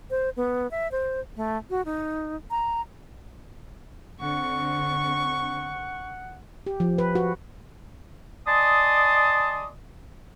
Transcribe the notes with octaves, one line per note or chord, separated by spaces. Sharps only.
C5
B3
E5
C5
A3
F#4
D#4
A#5
D3 C4 F#5 C#6
G4
F3
B4
F#4
D5 D#5 G#5 A5 C6 D#6